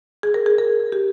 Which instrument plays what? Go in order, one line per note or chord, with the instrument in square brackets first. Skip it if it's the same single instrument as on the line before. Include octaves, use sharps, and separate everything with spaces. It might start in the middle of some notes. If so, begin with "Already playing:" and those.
[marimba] G#4
A#4
G#4
A#4
G4